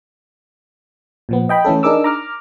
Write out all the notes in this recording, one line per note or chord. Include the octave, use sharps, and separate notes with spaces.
A#2 F3 B3
D#5 G5 B5
E3 A3 C#4 A4
D4 D#4 G#4 A#4 D6 E6
A#5 D6 F6